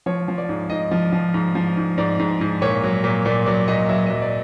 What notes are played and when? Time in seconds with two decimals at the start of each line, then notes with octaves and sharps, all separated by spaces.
0.06 F3 C#5
0.28 F3
0.38 D5
0.49 G#2
0.70 G#2 D#5
0.91 F3
1.13 F3
1.34 G#2
1.55 F3
1.77 G#2
1.98 G#2 D5
2.19 G#2
2.41 G#2
2.62 A#2 C#5
2.84 F#3
3.04 A#2
3.25 A#2 D5
3.46 F#3 D5
3.68 A#2 D#5
3.89 F#3 E5
4.06 F#3 D#5
4.22 D5